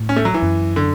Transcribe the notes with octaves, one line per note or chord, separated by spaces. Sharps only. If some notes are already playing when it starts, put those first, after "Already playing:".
Already playing: A2
C#4
A3
F#3
E3
F#2
D3